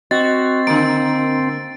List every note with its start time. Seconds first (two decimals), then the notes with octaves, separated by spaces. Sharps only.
0.11 C4 F#4 D#5 A6
0.67 D3 A#3 D7